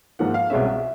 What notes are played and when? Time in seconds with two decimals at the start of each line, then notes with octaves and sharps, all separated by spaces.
0.19 G#2 F3 A#3 F#5
0.34 F5
0.50 C2 B2 G#3 C#4 E5